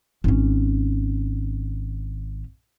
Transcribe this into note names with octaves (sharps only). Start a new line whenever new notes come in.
G#1 C#4